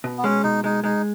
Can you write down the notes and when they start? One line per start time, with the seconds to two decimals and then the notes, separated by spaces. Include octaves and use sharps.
0.04 B2
0.18 B3
0.24 G#3 C#4
0.44 B2 D#4
0.64 G#3 D#4
0.84 G#3 D#4